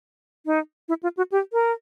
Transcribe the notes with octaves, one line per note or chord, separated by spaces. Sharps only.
D#4
E4
F4
F#4
G4
A#4